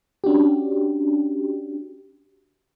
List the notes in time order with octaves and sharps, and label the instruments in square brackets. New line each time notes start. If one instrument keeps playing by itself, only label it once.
[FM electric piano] C#4 D4 F#4 G4